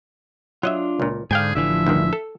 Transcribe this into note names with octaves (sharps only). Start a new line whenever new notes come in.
F#3 D4 F4 D#5 E5
C#2 A#2
G#2 D3 D4 G#4 F5 G5 G#5 G6
A1 D3 E3 F3 E5
D2 G2 D#3
A4